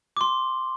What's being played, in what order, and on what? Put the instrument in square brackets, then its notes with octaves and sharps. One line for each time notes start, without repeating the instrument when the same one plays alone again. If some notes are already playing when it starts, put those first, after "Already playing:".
[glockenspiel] D6
C6